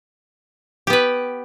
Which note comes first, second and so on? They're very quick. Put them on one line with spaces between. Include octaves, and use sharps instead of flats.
G4 B3 B4